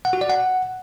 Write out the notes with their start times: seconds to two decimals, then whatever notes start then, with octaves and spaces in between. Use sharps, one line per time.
0.05 F#5
0.13 F#4
0.21 D5
0.30 F#5